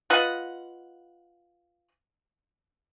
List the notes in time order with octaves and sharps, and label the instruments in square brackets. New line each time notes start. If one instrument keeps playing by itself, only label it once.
[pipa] F4 B4 D#5 F#5